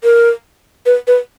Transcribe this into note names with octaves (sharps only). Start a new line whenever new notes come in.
A#4
B4
B4